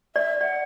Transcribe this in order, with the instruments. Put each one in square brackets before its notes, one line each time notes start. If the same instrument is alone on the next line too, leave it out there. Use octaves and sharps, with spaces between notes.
[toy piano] D5 [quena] E5
[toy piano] D5 [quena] F#5